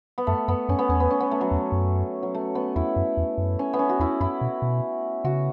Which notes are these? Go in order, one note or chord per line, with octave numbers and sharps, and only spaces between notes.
B3
F#2 A3
F#2 B3
F#2 C#4
B3
E2 C#4
B3
C#4
B3
A3
F#3
E2
F#2
F#3
A3
B3
E2 E4
F#2
E2
F#2
C#4
B3
C#4
F#4
E2 E4
F#2 E4
B2
B2
C#3 F#4